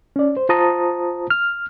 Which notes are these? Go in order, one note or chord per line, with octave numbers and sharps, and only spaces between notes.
C#4 D5
C5
F4 C5 A5 A#5 D#6
F6